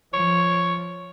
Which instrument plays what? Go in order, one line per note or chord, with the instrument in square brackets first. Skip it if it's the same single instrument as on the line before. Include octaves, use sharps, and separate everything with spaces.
[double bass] F3 [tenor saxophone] C#5